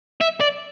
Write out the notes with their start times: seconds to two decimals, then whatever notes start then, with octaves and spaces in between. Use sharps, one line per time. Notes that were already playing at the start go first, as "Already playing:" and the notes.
0.21 E5
0.41 D5